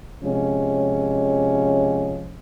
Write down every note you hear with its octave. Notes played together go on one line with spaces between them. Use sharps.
C3 F3 G#3 C#4